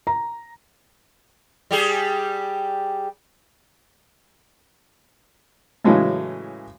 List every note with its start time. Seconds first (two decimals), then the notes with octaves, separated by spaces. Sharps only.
0.07 A#5
1.71 G3 G4 G#4
5.84 A2 C#3 E3 F#3 G#3 A3